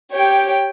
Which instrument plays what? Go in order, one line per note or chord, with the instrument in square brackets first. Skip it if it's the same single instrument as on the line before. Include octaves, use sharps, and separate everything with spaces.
[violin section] G4 C#5 G5